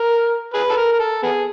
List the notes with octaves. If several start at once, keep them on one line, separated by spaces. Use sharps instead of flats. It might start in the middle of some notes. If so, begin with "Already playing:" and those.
Already playing: A#4
G#4 B4
A4
A#4
A#4
A4
B3 G#4